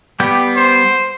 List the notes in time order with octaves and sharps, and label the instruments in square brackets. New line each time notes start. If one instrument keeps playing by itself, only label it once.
[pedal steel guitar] G3 B3 G6 [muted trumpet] G4
[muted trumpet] C5